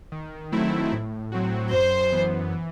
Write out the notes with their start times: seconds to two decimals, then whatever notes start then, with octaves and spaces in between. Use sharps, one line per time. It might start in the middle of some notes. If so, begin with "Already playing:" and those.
0.12 D#3
0.52 F#3 A3 C4 E4
0.93 A2
1.32 F#3 C4 F#4
1.72 F#2 C5
2.12 E3 B3
2.52 E3